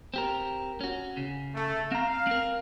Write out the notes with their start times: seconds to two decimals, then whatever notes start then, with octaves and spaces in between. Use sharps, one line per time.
0.14 C4 G4 A#4
0.81 C#4 F#4
1.17 C#3
1.55 A3
1.92 C4 F5 A#5
2.27 C4 A#4